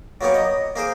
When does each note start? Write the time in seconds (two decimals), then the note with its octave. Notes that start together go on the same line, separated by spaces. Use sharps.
0.21 F#3 A#3 B3 G4 C#5
0.34 D#5
0.76 A#3 G#4 C5 D6